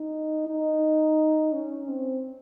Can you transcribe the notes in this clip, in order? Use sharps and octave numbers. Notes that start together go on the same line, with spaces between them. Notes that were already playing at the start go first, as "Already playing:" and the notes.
Already playing: D#4
D#4
C#4
C4